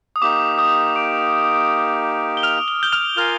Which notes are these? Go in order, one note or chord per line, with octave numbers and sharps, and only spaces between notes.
D#6
A#3 D#4 G4 D6
D#6
D6 D7
G7
F6 F7
G7
G6 G7
F6 F7
F4 A#4 F5 G#5 F6 F7